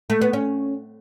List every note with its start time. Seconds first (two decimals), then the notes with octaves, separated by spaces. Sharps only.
0.10 A3
0.21 B3
0.33 C#4